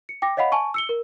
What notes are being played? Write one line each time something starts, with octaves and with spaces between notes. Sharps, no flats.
C#7
G5 D6 A#6
C#5 D#5 F5 F#5 B5
G#5 A5 C#6
E6 C#7 G7
A#4